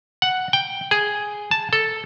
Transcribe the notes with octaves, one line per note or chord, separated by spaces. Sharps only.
F#5
G5
G#4
A5
A4